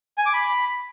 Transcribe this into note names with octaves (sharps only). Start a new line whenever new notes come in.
G#5
D6
B5